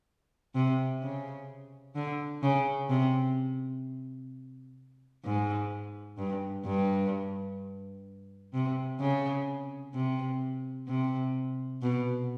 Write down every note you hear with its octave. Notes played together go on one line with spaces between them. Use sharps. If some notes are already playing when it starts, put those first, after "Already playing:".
C3
C#3
D3
C#3
C3
G#2
G2
G2
C3
C#3
C3
C3
B2